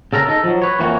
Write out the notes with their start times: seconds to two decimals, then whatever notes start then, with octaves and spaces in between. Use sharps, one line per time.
0.13 C#3 A4 A#4 A#5
0.28 D#4 A4
0.44 F3 F#3
0.62 B4 C#5
0.79 F2 E3 A#3 F#4 C#5